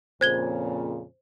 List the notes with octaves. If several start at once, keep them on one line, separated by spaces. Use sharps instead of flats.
F2 A#2 C#3 C5 G#6 G7